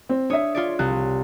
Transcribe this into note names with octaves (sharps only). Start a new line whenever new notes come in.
C4
D4 C#5 E5 D#6
F4 C#5 D5
C2 F#6